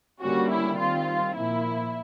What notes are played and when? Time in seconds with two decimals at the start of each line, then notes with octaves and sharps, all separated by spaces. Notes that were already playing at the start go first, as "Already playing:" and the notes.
0.22 D3 G3 A#3 C#4 F#4
0.50 E4
0.78 D#3 G3 C4 F4
1.35 A#2 F3 A#3 E4